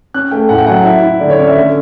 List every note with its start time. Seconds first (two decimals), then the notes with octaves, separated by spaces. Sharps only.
0.14 C#4 F#6
0.31 A3 G5
0.49 A2 F#5
0.58 G5
0.67 F#3 F#5
0.85 E4 E5
1.02 E4
1.20 D3 D5
1.30 C#5
1.39 C#4 D5
1.47 E5
1.57 D3